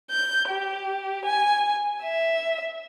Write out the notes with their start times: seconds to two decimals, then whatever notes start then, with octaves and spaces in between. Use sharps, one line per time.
0.11 G6
0.50 G4
1.26 G#5
2.03 E5